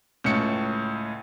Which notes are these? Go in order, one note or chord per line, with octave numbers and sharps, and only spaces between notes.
C#2 A2 C#7